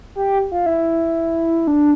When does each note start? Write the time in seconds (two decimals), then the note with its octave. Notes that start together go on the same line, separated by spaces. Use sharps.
0.15 G4
0.52 F4
0.66 E4
1.67 D4